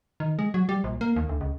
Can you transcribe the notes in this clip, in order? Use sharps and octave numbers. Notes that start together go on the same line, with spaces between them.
D#3
G#3
F#3
G3
A#1
A#3
D#2
D2
C#2